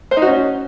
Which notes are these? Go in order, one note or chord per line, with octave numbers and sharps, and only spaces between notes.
C5
D#4
F#4
C#4